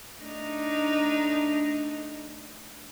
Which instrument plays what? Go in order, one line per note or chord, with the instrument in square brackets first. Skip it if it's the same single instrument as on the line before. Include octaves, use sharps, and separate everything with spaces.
[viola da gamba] A3 D4 D#4